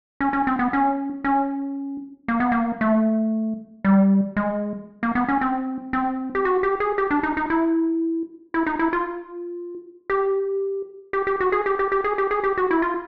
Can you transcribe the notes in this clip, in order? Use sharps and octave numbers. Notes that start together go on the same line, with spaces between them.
C#4
C#4
C4
B3
C#4
C#4
A#3
B3
A#3
A3
G3
G#3
A#3
B3
C#4
C4
C4
G4
F#4
G4
G#4
G4
D4
D#4
D#4
E4
E4
D#4
E4
F4
G4
G4
G4
F#4
G#4
G4
G4
G4
G#4
G4
G#4
G4
F#4
E4
F4